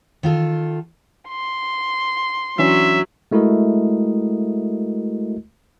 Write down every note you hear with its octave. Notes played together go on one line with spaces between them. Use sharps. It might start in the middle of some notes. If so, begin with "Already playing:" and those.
D#3 F4 A4
C6
E3 F#3 C#4 D4 E5
G#3 A3 E4 F#4 A#4 D#5